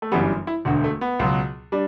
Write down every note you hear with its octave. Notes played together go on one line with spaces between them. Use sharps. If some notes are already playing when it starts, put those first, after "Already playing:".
A3
G1 F#2 E3 G3 B3
E4
E1 D2 D3 F#4
A3
B3
C#2 B2 F#3
G3 D4